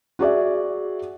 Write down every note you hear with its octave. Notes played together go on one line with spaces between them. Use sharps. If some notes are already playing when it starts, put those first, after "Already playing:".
F#4 G#4 D5 E5